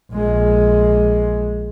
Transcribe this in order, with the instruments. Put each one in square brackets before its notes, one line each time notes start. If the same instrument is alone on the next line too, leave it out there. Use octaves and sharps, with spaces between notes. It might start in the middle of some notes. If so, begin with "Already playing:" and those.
[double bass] A#1 G#3